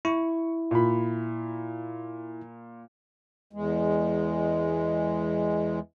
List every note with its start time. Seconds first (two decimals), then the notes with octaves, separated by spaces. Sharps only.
0.05 E4 C#6
0.71 A#2 B5
3.53 E2 G#3